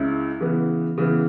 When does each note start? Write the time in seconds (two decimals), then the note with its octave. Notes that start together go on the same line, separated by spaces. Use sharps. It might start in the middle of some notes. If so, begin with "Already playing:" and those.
Already playing: C#2 C#3 G#3 C#4 E4
0.41 C#3 E3 B3
0.98 C#3 E3 B3